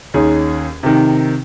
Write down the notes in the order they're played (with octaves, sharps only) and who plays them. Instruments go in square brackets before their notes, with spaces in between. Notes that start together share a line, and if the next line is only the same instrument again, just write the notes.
[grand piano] D#2 C#4 D#4 G#4
C3 D#3